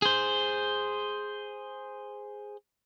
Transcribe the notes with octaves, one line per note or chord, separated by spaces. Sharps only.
G#4 C5